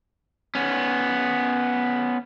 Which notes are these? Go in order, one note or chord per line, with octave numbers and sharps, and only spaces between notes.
B3 C#4